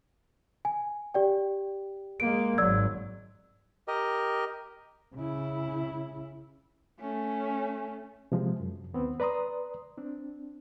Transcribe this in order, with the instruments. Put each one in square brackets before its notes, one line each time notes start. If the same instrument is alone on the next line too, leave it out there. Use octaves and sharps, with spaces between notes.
[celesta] G#5
G4 D5 G5
[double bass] G#3 A#3 [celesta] D7
[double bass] G#1 F#3 [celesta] D5 E6 G#6
[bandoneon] G4 A#4 D#5
[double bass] C#3 E4
[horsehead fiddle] A3 C#4
[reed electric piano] C3 F3 G#3
F#2
D#2 B3 C4
B4 D5 A#5 C6 D#6
C4 D4